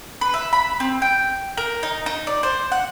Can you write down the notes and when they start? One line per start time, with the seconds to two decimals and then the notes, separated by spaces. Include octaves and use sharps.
0.21 B4
0.34 E5
0.53 B5
0.80 C4
1.02 G5
1.57 A#4
1.83 D#4
2.06 D#4
2.27 D5
2.43 C5
2.72 F#5